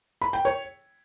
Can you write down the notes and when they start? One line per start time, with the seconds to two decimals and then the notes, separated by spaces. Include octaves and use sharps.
0.22 B5
0.33 G5
0.45 C#5